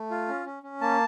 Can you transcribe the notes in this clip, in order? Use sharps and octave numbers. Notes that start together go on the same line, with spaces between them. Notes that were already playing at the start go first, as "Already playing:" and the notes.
Already playing: A3
F4
C#4
C#4
C#4
A#3 A5